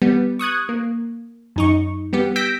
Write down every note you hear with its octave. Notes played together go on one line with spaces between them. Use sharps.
G3 B3
C#6 D#6 F#6 G#6
A#3
F#2 D#4 C#6
G3 B3 G4
E6 G6 A#6 B6 D7